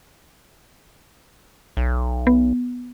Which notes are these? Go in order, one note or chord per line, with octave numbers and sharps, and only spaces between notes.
B1
B3